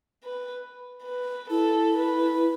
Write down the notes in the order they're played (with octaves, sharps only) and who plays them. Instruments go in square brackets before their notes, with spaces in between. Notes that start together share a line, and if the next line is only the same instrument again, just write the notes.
[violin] B4
B4
[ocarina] E4 [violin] A4
[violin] B4